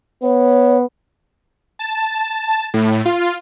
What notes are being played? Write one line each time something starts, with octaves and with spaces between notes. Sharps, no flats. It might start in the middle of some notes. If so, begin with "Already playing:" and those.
B3 C#5
A5
A2
F4